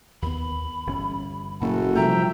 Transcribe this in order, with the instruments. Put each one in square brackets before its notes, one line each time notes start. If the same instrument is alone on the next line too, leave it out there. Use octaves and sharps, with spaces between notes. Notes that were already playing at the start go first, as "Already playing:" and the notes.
[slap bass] D#2 B3 [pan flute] B5
[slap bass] G1 E3 C#4
[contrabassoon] F#1 [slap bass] A#2 [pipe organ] F#4 A4
[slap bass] C3 G3 A3 [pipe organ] F3 E5 G5 [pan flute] A#5